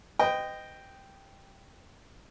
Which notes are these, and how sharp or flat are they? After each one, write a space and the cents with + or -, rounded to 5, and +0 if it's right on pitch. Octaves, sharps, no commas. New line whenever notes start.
B4 +45 D#5 -5 G5 +0